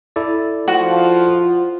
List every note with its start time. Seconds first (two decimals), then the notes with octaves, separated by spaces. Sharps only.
0.16 E4 A4 D5
0.68 F3 F4 F#4